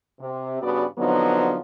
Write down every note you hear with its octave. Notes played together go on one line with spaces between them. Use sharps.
C3
G2 C#3 B3 F#4 D5
D3 F3 F#3 B3 C4 D#4